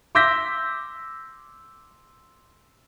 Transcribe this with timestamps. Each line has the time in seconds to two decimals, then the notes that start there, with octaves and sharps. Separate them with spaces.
0.15 C6 D6 E6 G6 A#6 B6